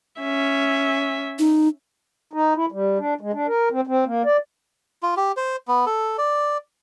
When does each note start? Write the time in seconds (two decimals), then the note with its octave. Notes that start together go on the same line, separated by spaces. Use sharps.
0.20 C#4 E5
1.39 D#4
2.33 D#4
2.56 E4
2.72 G3
2.99 D4
3.21 G#3
3.33 D4
3.47 A#4
3.71 C4
3.87 C4
4.06 A#3
4.25 D5
5.03 F4
5.17 G4
5.37 C5
5.68 B3
5.86 A4
6.18 D5